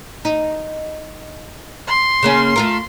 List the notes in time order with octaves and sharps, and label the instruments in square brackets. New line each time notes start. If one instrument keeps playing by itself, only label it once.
[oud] D#4
[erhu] C6
[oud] C#3 A#3 C#4
A3 F4 A#4